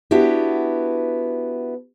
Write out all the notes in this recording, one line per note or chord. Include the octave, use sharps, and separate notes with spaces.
B3 D4 E4 F#4 G4